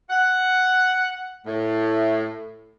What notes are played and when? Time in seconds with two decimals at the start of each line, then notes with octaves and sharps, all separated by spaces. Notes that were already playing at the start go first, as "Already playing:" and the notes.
0.10 F#5
1.46 A2